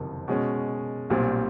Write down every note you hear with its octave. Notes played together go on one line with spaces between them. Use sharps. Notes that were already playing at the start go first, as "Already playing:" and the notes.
Already playing: F#1 F2 C3 D#3
B2 G#3 C#4
B1 A#2 G3 C4